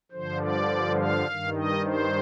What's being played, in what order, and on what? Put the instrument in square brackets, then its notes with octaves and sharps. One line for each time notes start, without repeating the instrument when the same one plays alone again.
[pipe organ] G2 D3 F3 C5
D5
F5
G2 D#3
D#5
C5